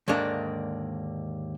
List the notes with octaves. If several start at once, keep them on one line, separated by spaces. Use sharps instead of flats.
D#2 G#2 D3 A#3 D4